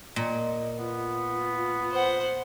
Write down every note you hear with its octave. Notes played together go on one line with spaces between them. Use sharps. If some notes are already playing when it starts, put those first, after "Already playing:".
A#2 D#5
B3 F4
C5 F#5